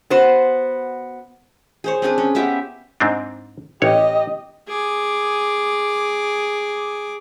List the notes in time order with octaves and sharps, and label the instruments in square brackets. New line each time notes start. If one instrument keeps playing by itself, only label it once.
[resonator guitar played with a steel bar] B3 F#4 C5
[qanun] G#4 C5 C#5
C4 D4 G#4 B4
C#4
B3 F4 G4 E5
[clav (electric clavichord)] G#2 C4 D4
[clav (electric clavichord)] A1 C#5 [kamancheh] G4 D#5
[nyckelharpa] G#4 D6